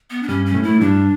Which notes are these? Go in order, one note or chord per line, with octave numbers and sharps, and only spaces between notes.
B3
D4
G2 G3 C#4
C#4
A2 A3
E4
A3
G2 G3 D4